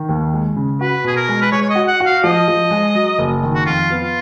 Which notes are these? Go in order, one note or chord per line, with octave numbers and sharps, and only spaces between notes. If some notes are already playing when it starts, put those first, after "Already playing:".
Already playing: D#3
D#2
G#3
C#3
F#4 B4
B2 G#4
A#4
G#3
B4
G#3 C#5
C#5
D#5
F#4
F#5
F#4
F5
F3 D#5
F3
G#3
F#3
F#1
D#3
F#4
F2 F4
B3
F4